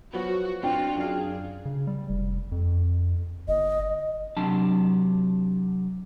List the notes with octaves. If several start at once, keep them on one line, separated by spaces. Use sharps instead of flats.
F3 F#3 B3 F#4
C4 D4 F4 F#4 G5
F#2 D4 G#4 D5 F5
C#3
G3
F1
F2
G1 D#5
C3 F#3 D4 A5